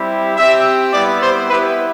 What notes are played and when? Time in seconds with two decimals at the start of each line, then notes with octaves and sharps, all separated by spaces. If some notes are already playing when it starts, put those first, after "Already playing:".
Already playing: G3 C4 E4 G4
0.37 C4 G4 E5
0.94 G3 B3 E4 G4 D5
1.22 C5
1.50 B3 E4 G4 B4